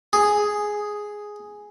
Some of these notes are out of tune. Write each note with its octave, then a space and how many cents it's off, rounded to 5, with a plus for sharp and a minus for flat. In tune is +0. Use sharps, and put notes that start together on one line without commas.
G#4 +0